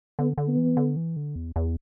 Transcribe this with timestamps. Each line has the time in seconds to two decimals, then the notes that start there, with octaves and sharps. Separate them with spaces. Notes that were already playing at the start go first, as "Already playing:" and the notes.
0.19 D3 B3
0.38 D3
0.48 B3
0.57 E3
0.77 D3
0.96 E3
1.16 D3
1.36 E2
1.56 E2